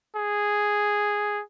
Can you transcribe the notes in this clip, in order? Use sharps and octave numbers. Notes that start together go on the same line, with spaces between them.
G#4